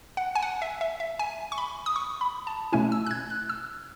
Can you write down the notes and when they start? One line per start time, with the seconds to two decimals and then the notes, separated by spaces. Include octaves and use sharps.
0.17 F#5
0.35 G#5
0.43 F#5
0.62 E5
0.81 E5
1.00 E5
1.19 G#5
1.52 C#6
1.58 B5
1.86 D#6
1.96 C#6
2.21 B5
2.47 A5
2.73 B2 A3 C#4 E4 G#5
2.92 E6
3.07 F#6
3.11 G#6
3.30 F#6
3.49 E6